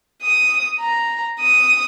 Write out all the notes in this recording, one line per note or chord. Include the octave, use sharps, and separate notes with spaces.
D#6
A#5
D#6